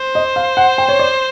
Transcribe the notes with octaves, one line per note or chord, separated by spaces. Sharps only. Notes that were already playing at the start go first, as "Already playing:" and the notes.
Already playing: C5
D#5
F5
F#5
G5
C#5
D5